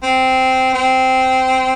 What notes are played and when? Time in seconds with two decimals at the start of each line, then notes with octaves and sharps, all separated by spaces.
0.03 C4
0.74 C4